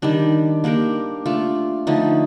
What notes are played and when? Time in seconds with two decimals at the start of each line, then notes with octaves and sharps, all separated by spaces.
0.02 D#3 G3 D4
0.64 A#3 D4 G4 A#4
1.26 A3 D4 F4
1.87 D3 F3 A3 D#4